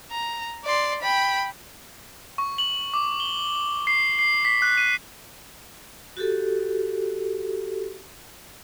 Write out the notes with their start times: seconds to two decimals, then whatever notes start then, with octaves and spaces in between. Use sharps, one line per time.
0.11 A#5
0.64 D5 C6
1.02 G5 B5
2.38 C#6
2.58 F#7
2.94 D6
3.20 G7
3.87 C7
4.19 C7
4.45 B6
4.62 F#6
4.77 D#7
6.17 F#4 G4 A4